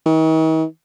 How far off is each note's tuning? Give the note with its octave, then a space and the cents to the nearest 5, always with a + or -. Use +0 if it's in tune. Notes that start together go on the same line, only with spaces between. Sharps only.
D#3 +45